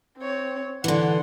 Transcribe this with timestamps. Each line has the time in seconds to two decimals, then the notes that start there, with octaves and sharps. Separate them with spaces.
0.18 C4 C#5
0.84 D3 E3 F#5 C6